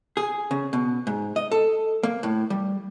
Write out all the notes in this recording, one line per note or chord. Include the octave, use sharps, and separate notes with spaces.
G#4
C#3
B2
G#2
D#5
A4
A#3
A2
G3